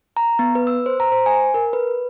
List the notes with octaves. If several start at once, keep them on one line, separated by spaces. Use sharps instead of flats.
A#5
B3
B4
E6
C5
A#5
C5
G#5
A#4
B4